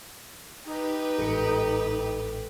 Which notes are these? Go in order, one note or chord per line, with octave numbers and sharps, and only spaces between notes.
D#4 G4 B4
A1 G#2 A4 C#7